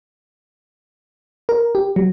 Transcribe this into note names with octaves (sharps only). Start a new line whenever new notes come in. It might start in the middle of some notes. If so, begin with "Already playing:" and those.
A#4
G4
F#3